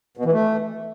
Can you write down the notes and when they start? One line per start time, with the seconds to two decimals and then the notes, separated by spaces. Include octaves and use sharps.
0.17 B2
0.25 E3
0.33 A3